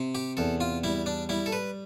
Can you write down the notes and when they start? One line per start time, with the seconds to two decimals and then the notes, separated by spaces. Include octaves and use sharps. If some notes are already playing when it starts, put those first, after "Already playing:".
Already playing: C3
0.15 G4
0.37 E2 A4
0.60 F4
0.84 G3 E4
1.06 D4
1.29 G3 E4
1.46 A4
1.52 B4